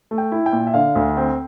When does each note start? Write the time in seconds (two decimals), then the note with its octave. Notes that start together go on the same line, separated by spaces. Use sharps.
0.11 A3
0.18 G5
0.32 E4
0.46 G5
0.53 A#2
0.67 E5
0.74 D3 F5
0.95 D2
1.17 C4 G5